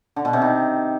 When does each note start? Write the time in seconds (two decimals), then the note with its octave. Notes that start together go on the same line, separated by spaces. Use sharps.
0.16 D3
0.25 B2
0.33 C3
0.42 D#3